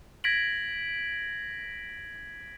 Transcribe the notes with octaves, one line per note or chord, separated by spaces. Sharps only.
G#6 A#6 B6 D7 F#7